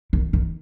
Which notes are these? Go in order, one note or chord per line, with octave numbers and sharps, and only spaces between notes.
D#3
D#3